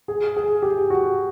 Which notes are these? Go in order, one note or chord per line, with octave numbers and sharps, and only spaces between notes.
G#4
G#4
G4
F#4